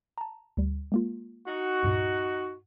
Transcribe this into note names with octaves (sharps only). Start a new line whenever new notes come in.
A5 A#5
D2 G3
G#3 A#3 F4
D#4 F#4
C#2 G2 A#2